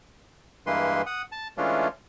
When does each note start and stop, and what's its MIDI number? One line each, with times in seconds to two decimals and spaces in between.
0.67 1.02 43
0.67 1.02 52
0.67 1.02 56
0.67 1.02 58
0.67 1.02 71
0.67 1.02 84
1.06 1.22 78
1.06 1.22 87
1.32 1.48 81
1.58 1.88 52
1.58 1.88 56
1.58 1.88 57
1.58 1.88 61
1.58 1.88 62
1.58 1.88 65